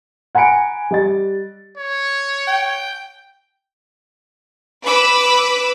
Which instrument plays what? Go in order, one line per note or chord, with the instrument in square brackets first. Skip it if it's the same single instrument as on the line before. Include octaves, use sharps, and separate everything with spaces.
[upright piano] F#5 G#5 A#5 B5 C#7 D7
G3 D#5 A6
[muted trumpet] C#5
[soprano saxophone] G5
[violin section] B4 B5 D6 E6